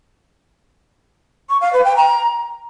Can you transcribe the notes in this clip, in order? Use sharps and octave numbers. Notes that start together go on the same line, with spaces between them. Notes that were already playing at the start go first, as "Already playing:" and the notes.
C#6
F5
B4
G5
A#5